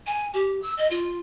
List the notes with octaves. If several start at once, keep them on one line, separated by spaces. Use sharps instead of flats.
G#5
G4
E6
D#5
F4